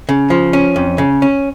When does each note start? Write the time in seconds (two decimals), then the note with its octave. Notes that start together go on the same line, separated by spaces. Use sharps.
0.09 C#3
0.30 F3
0.53 C#4
0.76 F2
0.98 C#3
1.22 C#4